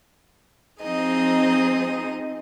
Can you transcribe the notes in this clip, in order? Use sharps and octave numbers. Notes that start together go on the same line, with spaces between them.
F3 C4 D#4 G#4 D#5